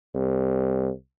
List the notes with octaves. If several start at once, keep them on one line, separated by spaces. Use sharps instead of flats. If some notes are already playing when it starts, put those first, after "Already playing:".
C2